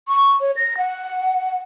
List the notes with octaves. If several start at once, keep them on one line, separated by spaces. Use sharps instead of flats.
C#6
C#5
A#6
F#5